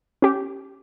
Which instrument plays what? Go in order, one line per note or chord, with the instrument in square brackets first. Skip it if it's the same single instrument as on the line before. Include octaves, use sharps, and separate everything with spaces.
[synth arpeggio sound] C#4 G4